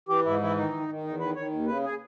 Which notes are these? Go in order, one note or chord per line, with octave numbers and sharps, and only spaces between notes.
E3 G4
G#2 E4
E3 E4
D#3 D#4
D#3
D#3
E2 D#4
D#3 B4
D#3 C#5
D#2
C#3 B4
G#4